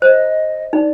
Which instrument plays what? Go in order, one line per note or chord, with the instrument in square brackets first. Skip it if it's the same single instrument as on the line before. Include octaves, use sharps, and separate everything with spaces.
[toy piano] C5 [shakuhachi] D#5
[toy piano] D#4 [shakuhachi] D5